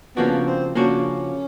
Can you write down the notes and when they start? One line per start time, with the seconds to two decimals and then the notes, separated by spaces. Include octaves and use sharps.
0.16 C#3 F3 A#3 B3 D4 F#4
0.45 C4
0.75 C#3 F3 A#3 C#4 D4 F#4